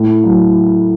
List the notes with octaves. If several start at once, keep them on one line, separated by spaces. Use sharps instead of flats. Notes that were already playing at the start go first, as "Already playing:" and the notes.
Already playing: A2
F#3